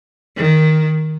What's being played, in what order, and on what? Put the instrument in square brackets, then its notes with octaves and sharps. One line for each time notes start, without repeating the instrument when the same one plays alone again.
[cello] D#3